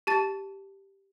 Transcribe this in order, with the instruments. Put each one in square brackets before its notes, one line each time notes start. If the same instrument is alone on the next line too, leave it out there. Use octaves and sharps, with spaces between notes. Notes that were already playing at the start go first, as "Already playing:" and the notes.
[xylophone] G4 A5 A6